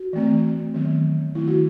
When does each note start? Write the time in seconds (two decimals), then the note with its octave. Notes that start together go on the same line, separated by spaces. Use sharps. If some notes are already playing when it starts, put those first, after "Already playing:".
Already playing: F#4
0.13 E3 A3 C4
0.74 D#3 F#3 B3
1.35 D#3 A3 C4 E4
1.48 F#4